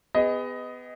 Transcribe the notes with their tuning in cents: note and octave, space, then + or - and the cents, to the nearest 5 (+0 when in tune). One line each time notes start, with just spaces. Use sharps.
B3 +20 G#4 -30 D#5 +10